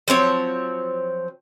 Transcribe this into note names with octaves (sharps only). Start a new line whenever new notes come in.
F3 F#3 C4 C#5